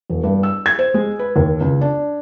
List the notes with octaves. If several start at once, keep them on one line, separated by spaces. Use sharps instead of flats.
E1
G2
E6
G#6
C5
G#3
B4
D#2
C#2
D4